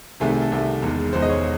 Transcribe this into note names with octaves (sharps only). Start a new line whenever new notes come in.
C2 C3 D#3 A3 G#4
G#4
A4
C2 C3 D#3 A3
E1 E2 D#3 G#3
E1 E2 D#3 G#3 C5
D#5
C#5